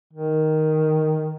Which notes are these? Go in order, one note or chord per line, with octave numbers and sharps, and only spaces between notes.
D#3